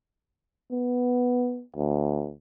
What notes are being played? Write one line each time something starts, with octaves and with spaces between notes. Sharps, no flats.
B3
D2